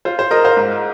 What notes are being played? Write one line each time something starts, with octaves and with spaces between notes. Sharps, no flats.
F4 C5
C5
F4 A#4 D#5
C5 F5
G#2